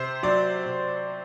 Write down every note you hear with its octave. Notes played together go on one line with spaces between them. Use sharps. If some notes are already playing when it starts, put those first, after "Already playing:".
Already playing: C3 C5
F#3 D5
C3